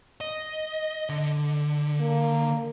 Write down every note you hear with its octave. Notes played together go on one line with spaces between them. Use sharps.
D#5
D3
A#3